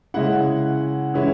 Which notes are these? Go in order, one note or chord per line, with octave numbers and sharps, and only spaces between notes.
C#3 G#3 C#4 E4 F#5
E3 G#3 C#4 E4